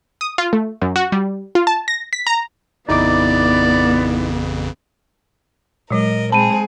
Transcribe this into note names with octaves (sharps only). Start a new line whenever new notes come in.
D#6
F4
A3
F#2
F#4
G3
F4
A5
A#6
B6
A#5
A1 F2 C#3 B3 D#4 E4 D5 D6
A#2 F#3 G#3 A#4 D#5
G#3 C4 G#4 A5 B5 D#7